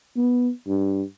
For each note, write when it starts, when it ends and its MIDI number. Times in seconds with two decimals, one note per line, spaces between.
0.17 0.50 59
0.67 1.02 43